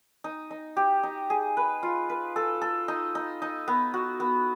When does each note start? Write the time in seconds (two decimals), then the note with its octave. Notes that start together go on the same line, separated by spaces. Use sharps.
0.24 D#4
0.51 D#4
0.77 G4
1.03 D#4
1.30 G#4
1.57 B4
1.83 F4
2.10 B4
2.36 A4
2.62 A4
2.88 D#4
3.15 D#4
3.42 D#4
3.68 B3
3.94 F#4
4.20 B3